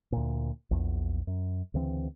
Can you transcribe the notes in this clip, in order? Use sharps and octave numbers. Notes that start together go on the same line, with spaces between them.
D2 A#2
A#1 E2
F#2
D2 C#3 E3 C4